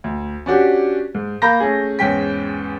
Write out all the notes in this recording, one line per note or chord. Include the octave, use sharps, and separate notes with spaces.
D2
C#4 D4 F#4 G4
G#2
A#3 A#5 B5 G6 A#6
A3 C#4 G#4
E2 G#2 C#4 G5 B6